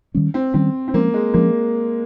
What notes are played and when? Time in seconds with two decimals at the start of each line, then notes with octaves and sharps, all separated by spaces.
0.15 D#3 G3 C#4
0.34 C4
0.54 D#3 G3 C4 C#4
0.88 C4
0.94 F3 G#3 A#3 C#4
1.14 G#3
1.34 F3 G#3 A#3 C#4